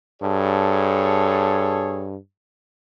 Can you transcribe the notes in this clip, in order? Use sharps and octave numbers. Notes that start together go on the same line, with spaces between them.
G2 G#4 A4 C#5